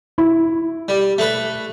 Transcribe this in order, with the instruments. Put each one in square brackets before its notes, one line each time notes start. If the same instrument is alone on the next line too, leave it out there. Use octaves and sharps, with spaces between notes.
[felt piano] E4
[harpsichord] G3
A3 B4